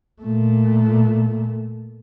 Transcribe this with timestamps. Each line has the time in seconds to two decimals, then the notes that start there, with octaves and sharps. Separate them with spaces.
0.22 A#2 A3